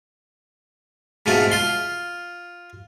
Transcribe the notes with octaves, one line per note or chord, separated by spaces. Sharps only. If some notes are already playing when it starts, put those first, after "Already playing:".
G#2 B2 A3 C4 F4
F4 C6